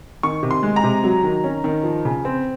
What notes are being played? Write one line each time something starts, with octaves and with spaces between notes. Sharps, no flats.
D#3 C#6
C3
C6
G#3
A#5
C3
F#3
D#3
C#4
D#3
F3
C#3
C4